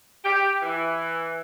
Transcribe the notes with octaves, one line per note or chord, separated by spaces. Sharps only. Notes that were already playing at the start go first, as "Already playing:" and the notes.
G4
E3